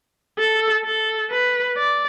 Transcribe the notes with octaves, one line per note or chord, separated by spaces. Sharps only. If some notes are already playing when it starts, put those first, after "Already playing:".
A4
A4
B4
D5